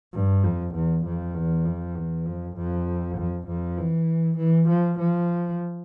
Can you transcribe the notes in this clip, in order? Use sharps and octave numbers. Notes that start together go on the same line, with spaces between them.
G2
F2
E2
F2
E2
F2
E2
F2
F2
F2
F2
E3
E3
F3
F3